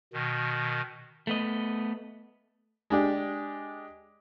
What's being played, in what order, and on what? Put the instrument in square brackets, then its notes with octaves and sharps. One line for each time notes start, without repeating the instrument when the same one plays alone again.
[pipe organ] B2 D#3
[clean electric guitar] A3 B3 D#5
[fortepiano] G#3 D4 G4